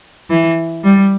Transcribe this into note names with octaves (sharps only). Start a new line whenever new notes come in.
E3
G3